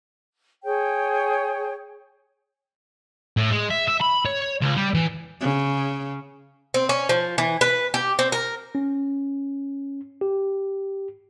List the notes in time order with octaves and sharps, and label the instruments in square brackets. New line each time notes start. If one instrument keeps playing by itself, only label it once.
[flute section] G#4 C#5 G5
[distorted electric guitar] A2
G#3
E5
E5
B5
C#5
C#2
G3
E3
[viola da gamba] C#3
[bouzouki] C4
C#4
F3
E3
B4
G4
C4
A#4
[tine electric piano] C#4
G4